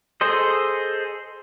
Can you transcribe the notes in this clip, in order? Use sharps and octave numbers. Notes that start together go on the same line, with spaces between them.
G#4 A4 C5 D#5